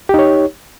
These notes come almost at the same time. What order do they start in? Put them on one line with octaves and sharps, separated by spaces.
G4 D#4 C#5